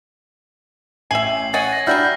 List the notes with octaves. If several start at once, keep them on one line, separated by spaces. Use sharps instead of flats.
A1 E5 G5 G#5 C7 F#7
C7
C#5 D#5 F#5 G#5 A6
A#6
F#3 G3 D4 E4 F#4 E5 F6 G6